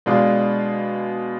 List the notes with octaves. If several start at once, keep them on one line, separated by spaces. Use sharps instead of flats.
B2 G#3 D4 F4